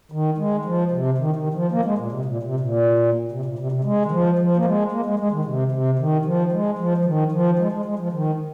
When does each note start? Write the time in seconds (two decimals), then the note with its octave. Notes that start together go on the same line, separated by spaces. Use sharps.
0.12 D#3
0.38 G#3
0.65 F3
0.92 C3
1.18 D#3
1.36 D#3
1.54 F3
1.72 A#3
1.85 G#3
1.98 A#2
2.12 C3
2.25 A#2
2.43 C3
2.60 A#2
3.32 C3
3.45 A#2
3.59 C3
3.72 C3
3.85 G#3
4.06 D#3
4.12 F3
4.38 F3
4.57 A#3
4.65 G#3
4.92 A#3
5.06 G#3
5.19 G#3
5.32 D#3
5.45 C3
5.72 C3
5.99 D#3
6.25 F3
6.52 G#3
6.79 F3
6.98 F3
7.05 D#3
7.32 F3
7.59 G#3
7.72 G#3
7.85 G#3
7.99 F3
8.13 D#3